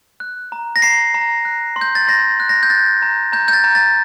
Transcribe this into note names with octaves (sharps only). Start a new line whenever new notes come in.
F#6
A#5
A#6
A#5 C7
A#5
F#6
C6
G6
A6
C6 A#6
F#6
A#6
G6
F#6 A6
A#5
A#5 G6
G6
A6
A#5
A6